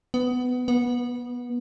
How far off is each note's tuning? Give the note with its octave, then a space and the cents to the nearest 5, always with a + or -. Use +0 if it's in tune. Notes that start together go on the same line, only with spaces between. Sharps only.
B3 +15
B3 -20